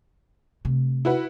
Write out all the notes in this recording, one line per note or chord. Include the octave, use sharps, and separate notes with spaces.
C3 A3
E4 F#4 B4